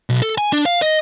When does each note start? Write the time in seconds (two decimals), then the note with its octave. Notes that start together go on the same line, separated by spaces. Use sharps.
0.10 B1
0.22 A4
0.38 G#5
0.53 D4
0.66 F5
0.82 D#5